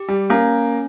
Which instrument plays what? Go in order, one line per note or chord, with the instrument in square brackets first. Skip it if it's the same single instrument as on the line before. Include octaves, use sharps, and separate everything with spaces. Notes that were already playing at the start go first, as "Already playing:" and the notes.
Already playing: [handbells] G4
[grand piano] G3
[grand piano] A#3 [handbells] C#4